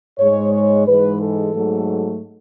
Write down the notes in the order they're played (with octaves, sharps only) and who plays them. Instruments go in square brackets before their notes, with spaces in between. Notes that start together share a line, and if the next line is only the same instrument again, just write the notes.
[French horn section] G#2 G#3 C#5
C#5
G#2 E3 G#3 B4
A4
G#2 F#3 A3